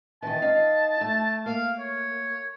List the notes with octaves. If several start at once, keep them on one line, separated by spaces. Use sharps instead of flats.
D#3 E3 A5
D#4 F5
A3
A#3 F5
C#5